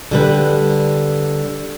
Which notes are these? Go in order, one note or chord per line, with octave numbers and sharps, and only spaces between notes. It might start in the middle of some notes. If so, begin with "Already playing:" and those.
D3 G3 B4